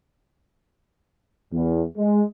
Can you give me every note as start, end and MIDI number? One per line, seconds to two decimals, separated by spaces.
1.53 1.82 40
1.97 2.23 56